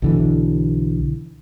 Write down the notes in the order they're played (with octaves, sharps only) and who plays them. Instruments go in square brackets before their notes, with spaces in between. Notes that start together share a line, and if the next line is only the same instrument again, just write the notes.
[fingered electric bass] B1 D3 E3